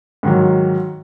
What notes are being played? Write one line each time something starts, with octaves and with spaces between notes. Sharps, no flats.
G#2 D#3 F#3